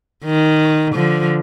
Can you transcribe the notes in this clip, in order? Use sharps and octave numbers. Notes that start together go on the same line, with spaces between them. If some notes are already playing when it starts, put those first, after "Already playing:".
D#3
D3 F3